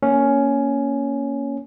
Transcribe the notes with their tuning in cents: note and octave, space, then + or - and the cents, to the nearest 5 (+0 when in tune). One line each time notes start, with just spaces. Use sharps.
A#3 +5 C#4 +10